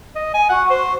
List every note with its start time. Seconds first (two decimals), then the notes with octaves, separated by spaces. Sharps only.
0.16 D#5
0.34 G#5
0.49 F#4 F#5
0.70 C5